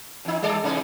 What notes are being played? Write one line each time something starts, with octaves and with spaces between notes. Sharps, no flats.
E2 D#4
G3 A4 D5
C3 E3 D#4